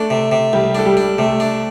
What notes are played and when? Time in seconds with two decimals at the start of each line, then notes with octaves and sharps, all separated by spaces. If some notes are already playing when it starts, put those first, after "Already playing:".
Already playing: A3 D4 A4
0.10 C3
0.32 C3
0.53 C2 G3 G4
0.75 D4 A4
0.86 G3 G4
0.97 D4
1.18 C3 A3 A4
1.40 D4